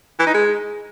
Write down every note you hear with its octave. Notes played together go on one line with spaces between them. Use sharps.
E3
D#4
G#3